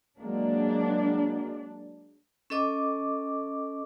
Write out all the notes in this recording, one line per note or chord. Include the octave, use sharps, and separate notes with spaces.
F#3 G#3 A#3 D4
C#4 A4 D#5 D6